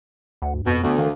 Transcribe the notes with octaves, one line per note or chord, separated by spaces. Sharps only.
D2 F#5
G2
F2 B2
D2 A3 B3
D#3 F5